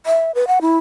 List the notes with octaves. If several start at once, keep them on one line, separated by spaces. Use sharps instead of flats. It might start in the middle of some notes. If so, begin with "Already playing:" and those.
E5
B4
F#5
E4